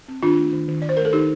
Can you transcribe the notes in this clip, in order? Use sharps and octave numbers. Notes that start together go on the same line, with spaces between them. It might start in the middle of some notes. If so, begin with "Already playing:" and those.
C4
D#3 D4 F4
A3
D#3
D#3
D#3 D5
C5
A3 A#4
A4
D#3 D#4 G4